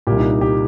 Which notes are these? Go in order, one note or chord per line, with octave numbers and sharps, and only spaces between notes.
C2 A#2 G4
D#4
D#4
G4